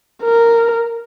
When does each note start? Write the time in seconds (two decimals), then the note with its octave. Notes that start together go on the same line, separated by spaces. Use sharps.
0.23 A#4